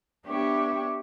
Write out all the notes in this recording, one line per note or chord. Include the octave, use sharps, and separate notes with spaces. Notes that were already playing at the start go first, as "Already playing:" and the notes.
B3 D4 G4 C#5 E5 G5